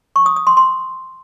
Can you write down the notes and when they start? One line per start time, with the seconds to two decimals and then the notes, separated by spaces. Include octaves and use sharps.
0.16 C#6
0.26 D#6
0.36 D#6
0.47 C6
0.57 C6